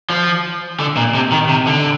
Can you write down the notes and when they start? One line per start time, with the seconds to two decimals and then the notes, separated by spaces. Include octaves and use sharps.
0.10 F3
0.80 D3
0.97 A#2
1.15 C3
1.32 D#3
1.49 C3
1.67 D3